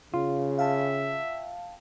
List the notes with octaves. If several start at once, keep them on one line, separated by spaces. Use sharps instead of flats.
C#3 F4
E5 F5 G5 A5